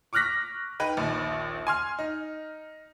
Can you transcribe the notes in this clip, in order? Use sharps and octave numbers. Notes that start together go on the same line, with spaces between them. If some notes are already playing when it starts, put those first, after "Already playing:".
C#6 D6 F6 F#6 A#6 B6
D#4 B4 G5
A#1 D#2
G#5 C6 F6
D#4